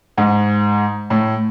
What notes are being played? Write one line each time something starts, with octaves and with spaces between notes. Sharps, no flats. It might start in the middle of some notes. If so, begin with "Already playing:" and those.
G#2
A2